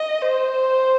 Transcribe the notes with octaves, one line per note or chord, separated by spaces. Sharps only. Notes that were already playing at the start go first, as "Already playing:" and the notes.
Already playing: D#5
C5